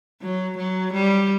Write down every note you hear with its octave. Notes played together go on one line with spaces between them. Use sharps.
F#3
F#3
G3